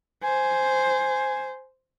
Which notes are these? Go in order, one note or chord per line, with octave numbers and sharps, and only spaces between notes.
C5 G#5